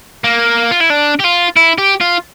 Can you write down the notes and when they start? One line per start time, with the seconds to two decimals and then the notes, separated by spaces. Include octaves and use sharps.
0.24 A#3
0.71 F4
0.81 E4
0.90 D4
1.19 G4
1.24 F4
1.56 E4
1.78 G4
2.00 F4